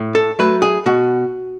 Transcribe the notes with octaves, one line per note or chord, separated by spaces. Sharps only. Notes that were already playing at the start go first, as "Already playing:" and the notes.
Already playing: A2
A4
F#3 A3 B4
G#4
B2 F#4